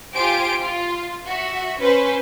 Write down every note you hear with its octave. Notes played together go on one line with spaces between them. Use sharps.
F4 G4 C5 G#5 D7
F4
F#4 E5
C#4 B4 C5